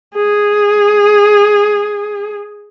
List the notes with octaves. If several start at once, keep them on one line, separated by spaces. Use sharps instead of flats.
G#4